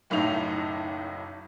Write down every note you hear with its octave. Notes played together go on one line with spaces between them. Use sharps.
F#1 B1 A2 D#4 F7